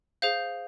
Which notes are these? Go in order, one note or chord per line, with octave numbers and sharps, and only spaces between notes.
G#4 C5 F5 G6